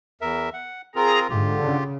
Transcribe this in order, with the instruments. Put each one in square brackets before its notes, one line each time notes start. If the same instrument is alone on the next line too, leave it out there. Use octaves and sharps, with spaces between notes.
[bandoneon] E2 A#4 E5
F#5
[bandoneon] C4 F4 A#4 [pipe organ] G#4 A#5
[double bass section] G#2 [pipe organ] D3 [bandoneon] F4 G4
[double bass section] C#3